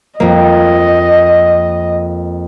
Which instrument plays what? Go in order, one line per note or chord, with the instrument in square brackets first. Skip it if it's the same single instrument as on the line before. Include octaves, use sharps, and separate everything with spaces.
[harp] F2 A#3 [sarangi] D#5